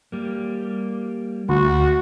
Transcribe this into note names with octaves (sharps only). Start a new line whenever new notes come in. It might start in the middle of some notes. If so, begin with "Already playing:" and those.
G3 A#3
D2 F#4